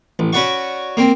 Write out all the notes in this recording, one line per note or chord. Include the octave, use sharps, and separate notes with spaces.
A1
C#4 F#4 B4 D5 F#5 C#6
A#3 C4